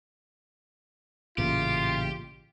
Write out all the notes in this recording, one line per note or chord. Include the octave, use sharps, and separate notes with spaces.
A1 A#2 C#3 F4 G4